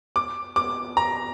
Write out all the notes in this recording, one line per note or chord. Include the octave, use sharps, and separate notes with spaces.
D6
D6
A#5